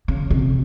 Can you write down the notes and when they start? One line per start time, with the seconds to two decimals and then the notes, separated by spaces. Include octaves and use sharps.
0.08 C#3
0.30 C3